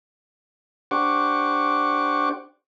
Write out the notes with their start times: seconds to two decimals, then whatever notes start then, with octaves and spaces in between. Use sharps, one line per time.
0.91 D4 G4 C5 F#5 C#6 D6